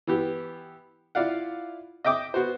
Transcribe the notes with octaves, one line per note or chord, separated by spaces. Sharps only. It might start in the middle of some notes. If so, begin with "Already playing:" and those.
E3 B3 G4
E4 F4 D5 F5 F#5
D#5 E5 G5 D6 D#6
B3 F#4 C5